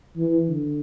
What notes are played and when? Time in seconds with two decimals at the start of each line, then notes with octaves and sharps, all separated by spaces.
0.17 E3
0.49 D3